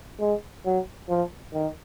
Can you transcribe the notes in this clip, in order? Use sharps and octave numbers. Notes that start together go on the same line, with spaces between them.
G#3
F#3
F3
D#3